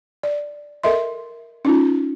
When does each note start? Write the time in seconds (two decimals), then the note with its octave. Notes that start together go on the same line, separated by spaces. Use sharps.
0.23 D5
0.83 A4 A#4 D#5 E5 C6
1.65 C#4 D#4 F4